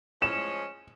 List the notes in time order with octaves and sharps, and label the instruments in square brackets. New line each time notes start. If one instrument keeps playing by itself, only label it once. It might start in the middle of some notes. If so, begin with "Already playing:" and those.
[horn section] F3 G#3 C#4 [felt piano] E7